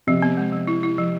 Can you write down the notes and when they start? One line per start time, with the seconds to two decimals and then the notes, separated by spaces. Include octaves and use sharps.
0.07 C3 F3
0.22 B3
0.37 G#3
0.52 F3
0.67 E4
0.83 E4
0.98 F3